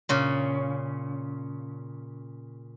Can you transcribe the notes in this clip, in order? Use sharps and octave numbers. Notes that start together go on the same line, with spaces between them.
A#2 C#3